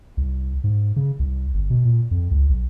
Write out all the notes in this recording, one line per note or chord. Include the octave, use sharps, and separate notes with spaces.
C2
G#2
C#3
C2
G1
B2
A#2
F2
C#2
B1